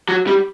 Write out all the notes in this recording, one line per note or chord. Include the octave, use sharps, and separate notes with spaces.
F#3
G3